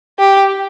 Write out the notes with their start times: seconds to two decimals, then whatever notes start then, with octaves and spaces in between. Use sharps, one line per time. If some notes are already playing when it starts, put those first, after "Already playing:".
0.19 G4